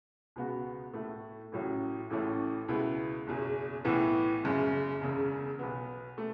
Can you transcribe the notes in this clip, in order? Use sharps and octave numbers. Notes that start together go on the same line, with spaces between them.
C#2 B2 B3 F#4
A2 A3 E4
A1 A2 F#3 C#4
A1 A2 E3 A3 C#4
C#2 B2 B3 E4
F#1 E2 B2
B1 A2 E3 B3 E4
F#1 F#2 C#3
E1 E2 C#3
B1 B2 B3
A3